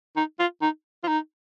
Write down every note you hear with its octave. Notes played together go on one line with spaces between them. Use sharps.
D#4
F4
D#4
F4
D#4